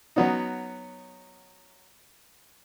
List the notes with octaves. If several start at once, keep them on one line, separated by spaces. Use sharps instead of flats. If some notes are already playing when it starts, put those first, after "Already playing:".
F#3 B3 C#4 D#4